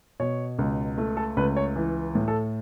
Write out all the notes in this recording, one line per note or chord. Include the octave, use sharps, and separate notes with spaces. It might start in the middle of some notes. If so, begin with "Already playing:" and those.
B2 C#5
C#2
A3
A4
C#2 B4
C#5
E3
A2
A4